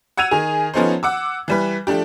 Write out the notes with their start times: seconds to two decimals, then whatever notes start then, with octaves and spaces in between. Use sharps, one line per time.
0.17 F#5 E6 G#6 D#7 F7
0.31 D#3 G#4
0.74 F3 B3 C#4 D#4 A4 C5
1.03 F#5 D6 E6
1.48 E3 G3 B4
1.87 F3 A3 D4 G4